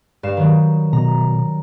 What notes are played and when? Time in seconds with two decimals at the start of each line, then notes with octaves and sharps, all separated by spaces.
0.23 G2 F5 E7
0.37 D#3 F#3
0.93 B2 A#5